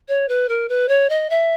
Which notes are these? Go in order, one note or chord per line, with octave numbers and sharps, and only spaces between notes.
C#5
B4
A#4
B4
C#5
D#5
E5